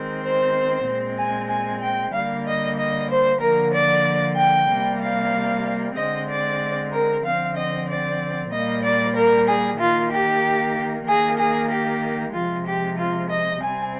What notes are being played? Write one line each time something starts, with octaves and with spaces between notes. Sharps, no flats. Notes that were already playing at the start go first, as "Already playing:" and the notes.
Already playing: D#3 G#3 C4
C5
A#2 G#3 C4
G#5
G#5
G5
D3 G3 A#3 F5
D#5
D#5
C5
D3 F3 A#3 A#4
D5
G5
C3 G3 A#3
F5
D3 G#3 C4 D#5
D5
A#4
D3 F3 C4 F5
D#5
D5
A#2 G3 A#3 D#5
D5
A#4
G#4
D#3 A#3 F4
G4
D#3 A#3 G#4
G#4
G4
C3 F3 G#3 F4
G4
F4
D#5
C3 G3 C4 G#5